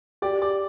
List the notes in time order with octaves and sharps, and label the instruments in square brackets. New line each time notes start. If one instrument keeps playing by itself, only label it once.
[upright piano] G4 [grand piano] D5
[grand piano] D5